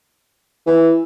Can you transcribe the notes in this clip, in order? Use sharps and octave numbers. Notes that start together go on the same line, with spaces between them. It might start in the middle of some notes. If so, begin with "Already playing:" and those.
E3